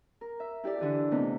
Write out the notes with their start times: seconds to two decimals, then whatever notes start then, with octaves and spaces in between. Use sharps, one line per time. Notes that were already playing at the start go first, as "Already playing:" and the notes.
0.21 A#4
0.40 E5
0.64 E4 G4 A4 D5
0.79 D3 E3 G4
1.11 C3 A3 B3 D#4